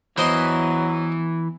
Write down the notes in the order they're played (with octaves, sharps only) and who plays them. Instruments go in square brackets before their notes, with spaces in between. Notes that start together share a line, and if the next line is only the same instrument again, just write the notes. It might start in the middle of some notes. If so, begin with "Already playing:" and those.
[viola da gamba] E2 [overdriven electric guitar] E3 [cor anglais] F#3 [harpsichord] C5 D#5 C6